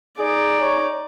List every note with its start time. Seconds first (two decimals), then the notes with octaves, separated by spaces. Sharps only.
0.19 D#4 G#4 D5
0.61 C#5